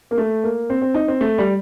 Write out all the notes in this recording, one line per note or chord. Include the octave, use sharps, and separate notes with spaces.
A#3
A3
A#3
C4
C4
D#4
C4
A3
G3